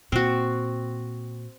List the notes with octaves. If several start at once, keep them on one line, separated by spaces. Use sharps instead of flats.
A#2 C4 F#4